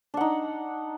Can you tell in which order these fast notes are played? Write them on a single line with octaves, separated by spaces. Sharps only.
D4 F#5 D#4